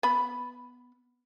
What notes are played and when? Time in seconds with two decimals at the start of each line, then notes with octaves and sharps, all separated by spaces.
0.03 B3 B5